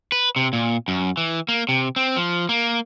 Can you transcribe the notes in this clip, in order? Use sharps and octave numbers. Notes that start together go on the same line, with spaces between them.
B4
C3
A#2
F#2
E3
A#3
C3
C4
F3
A#3